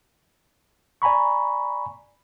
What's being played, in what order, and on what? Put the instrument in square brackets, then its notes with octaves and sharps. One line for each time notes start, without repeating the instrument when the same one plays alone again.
[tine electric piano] D5 G#5 A#5 B5 C#6